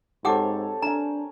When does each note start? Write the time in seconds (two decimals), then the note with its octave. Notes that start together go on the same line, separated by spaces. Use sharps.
0.25 G#2 C4 G4 A4 C#5 F#5 D6
0.82 D4 A#4 G#5 A#5